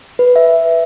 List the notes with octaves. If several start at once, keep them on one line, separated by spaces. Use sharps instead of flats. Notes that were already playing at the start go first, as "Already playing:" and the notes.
B4
E5